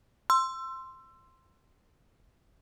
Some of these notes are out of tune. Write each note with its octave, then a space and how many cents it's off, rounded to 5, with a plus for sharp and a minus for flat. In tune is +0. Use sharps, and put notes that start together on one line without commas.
C6 +0 E6 +25